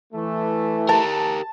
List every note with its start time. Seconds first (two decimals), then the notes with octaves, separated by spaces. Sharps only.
0.13 E3 A3
0.89 G4 A#4 A5